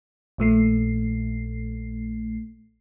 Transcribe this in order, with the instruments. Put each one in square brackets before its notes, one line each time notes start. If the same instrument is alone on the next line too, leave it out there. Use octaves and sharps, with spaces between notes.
[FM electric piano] A#1 A#2 A3 C7